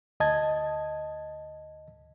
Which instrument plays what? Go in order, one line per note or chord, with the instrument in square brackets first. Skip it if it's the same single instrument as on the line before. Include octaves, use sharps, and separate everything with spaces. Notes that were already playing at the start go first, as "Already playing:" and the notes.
[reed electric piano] D2 D#5 A5 G#6